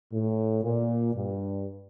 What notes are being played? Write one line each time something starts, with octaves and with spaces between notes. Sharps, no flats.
A2
A#2
G2